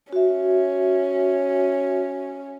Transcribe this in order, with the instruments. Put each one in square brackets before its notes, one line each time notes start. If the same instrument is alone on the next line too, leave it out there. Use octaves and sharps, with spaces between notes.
[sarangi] C#4 [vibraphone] F#4 E5